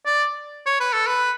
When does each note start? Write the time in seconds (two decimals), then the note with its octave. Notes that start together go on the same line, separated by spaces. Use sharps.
0.06 D5
0.66 C#5
0.80 B4
0.93 A4
1.07 B4